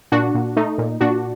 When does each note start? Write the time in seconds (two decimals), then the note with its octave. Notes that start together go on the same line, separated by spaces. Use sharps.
0.12 A#2 D4 F#4
0.35 A#2
0.56 A3 D#4
0.78 A#2
1.00 A#2 D4 F#4